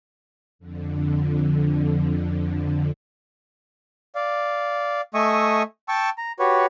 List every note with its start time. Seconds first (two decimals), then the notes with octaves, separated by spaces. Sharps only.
0.59 F2 D3
4.15 D5 F5
5.14 A3 D#5 E5 G#5 C#6 D#6
5.88 G5 A5 C#6 E6
6.18 A#5
6.39 F#4 G4 B4 C#5